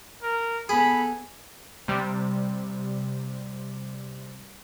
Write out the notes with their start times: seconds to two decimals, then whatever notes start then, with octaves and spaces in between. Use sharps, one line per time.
0.23 A#4
0.69 B3 G#4 A4 B5
1.88 C3 G3